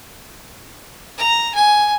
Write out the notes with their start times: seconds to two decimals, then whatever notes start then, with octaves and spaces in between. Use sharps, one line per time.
1.17 A#5
1.55 G#5